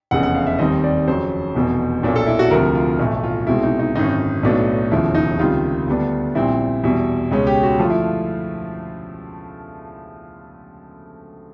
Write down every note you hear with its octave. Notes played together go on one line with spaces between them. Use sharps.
F1 E2 C#3 F#5
F#5
F5
E5
D#2 D#3 G3 C4 D#5
D5
F2 C#3 F#3 C5
F1 E2 B2
B1 A#2 F#3 A#3 D4
A4
E4
F#4
D2 C3 F3 A#4
F4
B1 A2 E3 A3
F4
C2 B2 G#3 C4 E4
D#4
D#4
G#1 F#2 D3 D#4
B1 A2 F#3 B3 D4
E1 D#2 C#3 F3 E4
D#4
C#2 C3 D#3 G3 F4
D2 D3 G3 B3 D4
A#1 A#2 G3 C4 E4
E2 B2 G3
C#2 B2 G#3 C#4
G4
F#4
G2 D3 F3 A3 F4
E4
F4